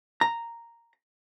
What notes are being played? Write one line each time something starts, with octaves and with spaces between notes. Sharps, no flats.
A#5